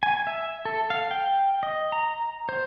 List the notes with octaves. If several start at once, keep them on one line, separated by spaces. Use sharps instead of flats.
G#5
E5
A4
F5
G5
D#5
A#5
C5